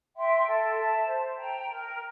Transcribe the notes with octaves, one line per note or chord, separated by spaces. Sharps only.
E5 G5 C6
A4
E5 A5
C5
G5 A#5
A#4